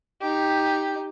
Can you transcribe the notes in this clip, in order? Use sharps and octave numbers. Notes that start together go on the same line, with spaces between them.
D#4 G4